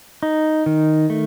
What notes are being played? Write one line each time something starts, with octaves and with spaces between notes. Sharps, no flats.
D#4
D#3
A3